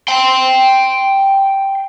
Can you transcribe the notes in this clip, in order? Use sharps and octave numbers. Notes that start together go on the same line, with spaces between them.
G5 C6